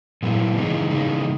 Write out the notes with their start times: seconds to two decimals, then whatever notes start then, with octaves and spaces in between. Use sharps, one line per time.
0.23 A#2 F#3 B3 E4
0.57 C#3 E3 G#3 D#4
0.90 C#3 E3 G#3 D#4